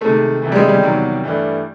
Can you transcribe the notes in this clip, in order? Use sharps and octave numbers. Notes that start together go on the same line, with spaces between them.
C3 D#3 G#3 A3
F2 C3 E3
G3
G#3
G3
E2 C3 D#3 F#3
G2 E3 A3 D4